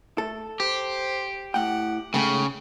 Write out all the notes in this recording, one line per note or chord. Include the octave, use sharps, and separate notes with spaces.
A3 A4
G4 C5
A2 F#5 G5
G#2 C#3 A3 G5